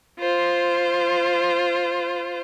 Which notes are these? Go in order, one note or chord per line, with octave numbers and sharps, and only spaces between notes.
F4 C5